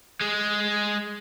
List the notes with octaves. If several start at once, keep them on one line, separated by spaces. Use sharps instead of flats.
G#3 G#4